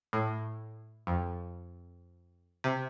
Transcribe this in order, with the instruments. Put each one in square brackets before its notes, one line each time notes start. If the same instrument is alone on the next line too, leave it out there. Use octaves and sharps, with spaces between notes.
[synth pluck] A2
F2
C3